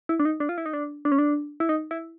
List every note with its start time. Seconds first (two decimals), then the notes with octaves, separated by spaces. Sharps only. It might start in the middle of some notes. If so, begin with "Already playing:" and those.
0.09 E4
0.20 D4
0.25 D#4
0.40 D4
0.49 F4
0.58 E4
0.66 D#4
0.73 D4
1.05 D4
1.12 C#4
1.18 D4
1.60 E4
1.69 D#4
1.91 E4